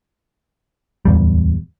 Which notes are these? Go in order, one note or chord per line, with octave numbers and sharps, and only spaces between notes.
D1 E2 G3